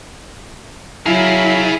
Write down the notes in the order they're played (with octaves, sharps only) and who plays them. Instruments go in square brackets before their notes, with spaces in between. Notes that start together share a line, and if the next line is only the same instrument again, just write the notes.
[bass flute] F#3 [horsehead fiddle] E4 [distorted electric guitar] G#4 F5 [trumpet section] A#4 A5 B5